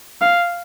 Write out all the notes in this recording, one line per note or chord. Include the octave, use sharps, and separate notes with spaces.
F5